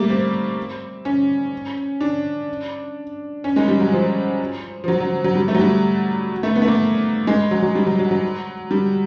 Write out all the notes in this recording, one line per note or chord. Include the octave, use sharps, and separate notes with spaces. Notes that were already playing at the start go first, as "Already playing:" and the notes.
Already playing: G3 A3 A#3
C4
C#4
D4
C#4
G#3
G3
F#3
F3
F3
F#3
F#3
F#3
G3
A3
F#3
G3
A3
B3
A3
A#3
G#3
F#3
F#3
G3
F#3
F#3
F#3
G3